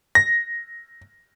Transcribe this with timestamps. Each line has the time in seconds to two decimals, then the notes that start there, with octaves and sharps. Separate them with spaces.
0.15 A#6